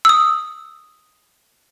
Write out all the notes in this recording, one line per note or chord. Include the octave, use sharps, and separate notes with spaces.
D#6 E6